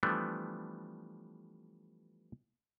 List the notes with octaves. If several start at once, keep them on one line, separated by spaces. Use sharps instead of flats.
E3 F3 G3 A3 B3 D4